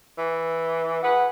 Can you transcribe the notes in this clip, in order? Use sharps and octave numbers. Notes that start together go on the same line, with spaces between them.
E3
G#4 B4 F#5